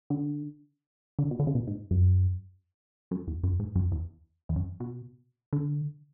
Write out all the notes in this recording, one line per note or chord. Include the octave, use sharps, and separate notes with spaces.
D3
D3
B2
D3
C#3
B2
G#2
F#2
F#2
E2
F#2
G#2
F#2
E2
E2
F#2
B2
D3